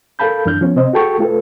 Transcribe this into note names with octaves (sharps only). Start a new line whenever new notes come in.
A4 A#4 F5 A5 B5 G6
F#2 E3 D4 F6 G6
F3 B3 C#4
C3 C4 C5 D#5
F#4 G#4 A4 G5 A5 C#6
A3 F4 A4 B4